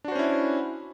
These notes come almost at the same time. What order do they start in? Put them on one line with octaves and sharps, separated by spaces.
D4 F#4 C5 C#4 E4